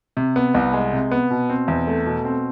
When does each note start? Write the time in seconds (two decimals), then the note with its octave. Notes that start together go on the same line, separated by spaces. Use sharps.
0.17 C3
0.36 B3
0.54 C2
0.73 G#3
0.93 C3
1.12 B3
1.31 B2
1.49 C4
1.68 E2
1.87 A3
2.06 B2
2.25 C4